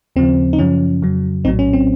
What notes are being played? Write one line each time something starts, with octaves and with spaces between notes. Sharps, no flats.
D#2 C#3 F3 C4
D#4
F#2 C#3 F3 C#4
F2 C#3 F#3
A#1 A2 F#3 C4 D#4
C#4
C4